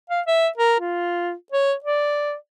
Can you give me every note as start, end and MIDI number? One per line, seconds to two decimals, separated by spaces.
0.10 0.21 77
0.27 0.48 76
0.58 0.78 70
0.80 1.33 65
1.52 1.74 73
1.84 2.35 74